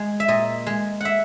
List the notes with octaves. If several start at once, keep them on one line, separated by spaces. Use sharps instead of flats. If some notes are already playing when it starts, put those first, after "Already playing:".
Already playing: G#3
E5
A#2 D#5
G#3
E5 F#5